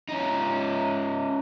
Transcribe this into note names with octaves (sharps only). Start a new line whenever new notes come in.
C#4 D#4